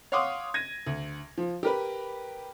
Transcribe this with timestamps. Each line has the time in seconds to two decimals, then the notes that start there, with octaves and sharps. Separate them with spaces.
0.12 C#5 F5 F#5 C6 D6 D#6
0.54 G#6 A#6 D#7
0.87 D2
1.38 F3
1.63 G4 A#4 B4